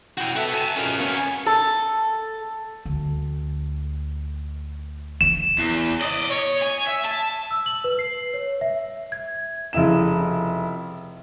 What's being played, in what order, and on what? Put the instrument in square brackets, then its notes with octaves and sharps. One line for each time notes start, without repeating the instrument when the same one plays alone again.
[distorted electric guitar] E4 F#4 [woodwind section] G5
[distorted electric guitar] F#4 B4 [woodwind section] A4 E5
[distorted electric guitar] G#5 A5
[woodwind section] C#2 B2 [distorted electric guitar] C#4 A#4
[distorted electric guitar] B3 C#4 [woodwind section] A#4 F5 G#5
[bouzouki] A4
[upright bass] D2
[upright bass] E3 D#4 [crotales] E7
[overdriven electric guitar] E2
D5 D#5
C#5
G#5
E5
A5
[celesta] E6
F#7
B4
C7
C#5
E5
G#6
[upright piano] F1 C#3 E4 E7